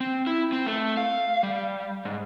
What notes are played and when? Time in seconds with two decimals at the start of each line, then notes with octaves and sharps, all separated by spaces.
0.01 C4
0.27 E4
0.52 C4
0.66 A3
0.97 F5
1.43 G3
2.05 G#2